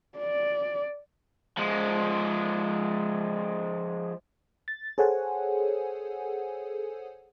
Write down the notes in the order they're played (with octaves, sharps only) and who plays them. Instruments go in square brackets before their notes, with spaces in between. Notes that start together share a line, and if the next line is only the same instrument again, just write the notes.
[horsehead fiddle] D5
[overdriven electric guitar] F3 G#3
[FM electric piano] A6
G#4 A4 C5 C#5 F#5 G#5